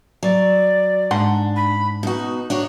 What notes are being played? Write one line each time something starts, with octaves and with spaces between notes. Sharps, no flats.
F#3 D5
G#2 D4 F#5 C6
B5
B2 D#4 F#4
D4 D#4 F#4 C#5